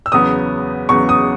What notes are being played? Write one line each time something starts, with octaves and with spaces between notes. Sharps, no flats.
E6
E2 C#3 F#3 B3 D#6
E2 C#3 F#3 B3 C#6
D#6